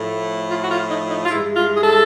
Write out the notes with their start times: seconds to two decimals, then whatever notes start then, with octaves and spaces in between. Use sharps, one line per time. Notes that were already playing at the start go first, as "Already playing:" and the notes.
Already playing: A2 F3 A3
0.51 F4
0.64 F#4
0.71 F4
0.91 D#4
1.11 D#4
1.25 F4
1.31 G2 E3 G#3 E4
1.56 F4
1.77 G#4
1.84 A4